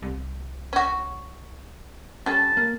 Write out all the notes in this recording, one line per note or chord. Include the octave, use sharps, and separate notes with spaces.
C2
C#4 F#4
G3 C#4 A4 A5
A#3